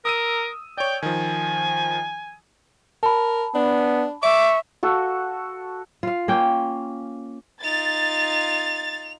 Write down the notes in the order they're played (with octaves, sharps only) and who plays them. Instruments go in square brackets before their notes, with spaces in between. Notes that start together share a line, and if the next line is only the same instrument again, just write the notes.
[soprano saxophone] A#4 [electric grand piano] D#6 E6 D#7
[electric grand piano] C#5 D5 [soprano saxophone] G5
[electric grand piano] D#3 F3 [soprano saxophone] G#5
[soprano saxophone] A#4 [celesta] A5 B5
[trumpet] B3 [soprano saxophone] D4
[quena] E5 [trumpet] C#6 [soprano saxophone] D6
[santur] F#4 A4
[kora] F4 F5
A#3 C#4 G5
[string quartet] D#4 F4 [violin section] A6 [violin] F7